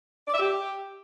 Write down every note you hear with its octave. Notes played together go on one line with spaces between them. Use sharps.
D5
E5
G4